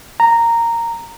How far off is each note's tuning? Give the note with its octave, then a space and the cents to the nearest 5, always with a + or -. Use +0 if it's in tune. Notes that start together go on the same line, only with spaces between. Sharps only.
A#5 -10